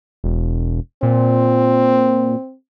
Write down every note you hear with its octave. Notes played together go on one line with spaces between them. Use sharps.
E1
A#2 C4